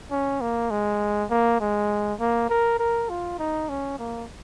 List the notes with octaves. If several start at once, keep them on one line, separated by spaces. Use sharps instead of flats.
C#4
A#3
G#3
A#3
G#3
A#3
A#4
A#4
F4
D#4
C#4
A#3